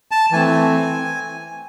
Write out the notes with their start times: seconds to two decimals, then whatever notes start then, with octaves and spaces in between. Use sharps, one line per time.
0.11 A5
0.32 E3 A3 C4 G#5